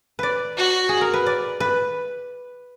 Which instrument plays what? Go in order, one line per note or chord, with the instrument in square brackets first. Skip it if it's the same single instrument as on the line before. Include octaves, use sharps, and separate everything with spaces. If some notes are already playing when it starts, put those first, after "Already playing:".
[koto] B4 D5
[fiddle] F#4
[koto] G#4
A#4
B4
D5
B4